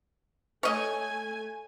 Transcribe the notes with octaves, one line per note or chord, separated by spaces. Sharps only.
A3 C#5 D#5 G#5